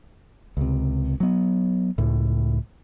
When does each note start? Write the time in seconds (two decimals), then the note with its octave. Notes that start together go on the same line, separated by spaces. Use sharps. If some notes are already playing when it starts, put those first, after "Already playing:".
0.57 C#2 C3
1.20 F#3 B3
1.98 C#2 A2